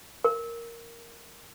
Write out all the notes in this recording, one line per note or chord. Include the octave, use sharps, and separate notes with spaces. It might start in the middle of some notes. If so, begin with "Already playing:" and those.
A#4